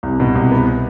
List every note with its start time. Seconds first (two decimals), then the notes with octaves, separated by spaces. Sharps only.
0.03 C2
0.20 B2
0.36 C2
0.51 B3